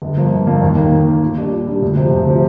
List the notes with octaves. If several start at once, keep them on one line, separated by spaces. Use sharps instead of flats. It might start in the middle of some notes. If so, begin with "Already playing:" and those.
G1
G2 F3 A#3
G1
G2 F3 A#3
D#2
D#3 A#3
D#2
D#3 A#3
A#2
G3 D4
A#2
G3 D4
D2
C3 F3
D2
C3 F3